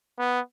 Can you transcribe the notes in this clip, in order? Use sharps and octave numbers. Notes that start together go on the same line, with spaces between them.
B3